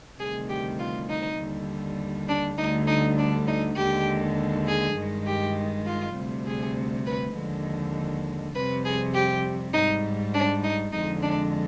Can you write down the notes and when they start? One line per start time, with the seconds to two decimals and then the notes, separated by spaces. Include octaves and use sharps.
0.18 D2 C3 D#3 G3 G#4
0.49 G4
0.79 F4
1.09 D#4
1.37 D#2 D3 G3
2.28 D4
2.58 D2 D3 G3 D#4
2.87 D#4
3.18 D4
3.47 D#4
3.76 D#2 D3 G#3 G4
4.66 G#4
4.95 G2 D#3 G#3
5.26 G4
5.86 F4
6.15 D2 C3 G3
6.46 G#4
7.06 B4
7.34 D#2 D3 F3 G#3
8.54 F2 C3 G3 B4
8.85 G#4
9.14 G4
9.73 G#2 G3 D#4
10.34 D4
10.63 D#4
10.92 F2 D3 G#3 D#4
11.22 D4